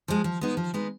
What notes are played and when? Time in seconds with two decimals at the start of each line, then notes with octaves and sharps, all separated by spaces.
0.08 F3 G#3
0.24 F3
0.41 G#3 B3 D#4
0.57 F3
0.74 G#3 B3 D#4